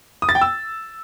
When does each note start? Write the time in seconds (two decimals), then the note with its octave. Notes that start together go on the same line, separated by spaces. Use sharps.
0.22 D#6
0.29 A6
0.35 G5
0.41 E6